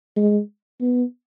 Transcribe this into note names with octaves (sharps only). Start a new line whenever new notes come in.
G#3
B3